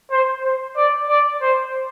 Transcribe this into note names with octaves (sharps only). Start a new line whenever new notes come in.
C5
C5
D5
D5
C5